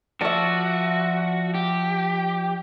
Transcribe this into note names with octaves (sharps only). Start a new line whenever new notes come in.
F3 F4 F#4 D5 E5 A5
G4